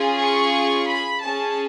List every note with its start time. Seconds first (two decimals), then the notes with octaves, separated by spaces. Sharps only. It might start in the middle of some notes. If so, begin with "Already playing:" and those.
Already playing: C#4 F4 G#4
0.23 C#6
0.89 B5
1.22 C#4 G#4 A5